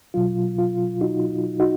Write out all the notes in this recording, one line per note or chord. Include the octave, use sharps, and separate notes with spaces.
B2 F#3 F4
F4
D#4 F#4
D#4 F#4